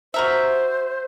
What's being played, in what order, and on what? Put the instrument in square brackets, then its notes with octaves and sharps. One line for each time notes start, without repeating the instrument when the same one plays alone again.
[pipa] F#4 A#4 E5 [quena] C5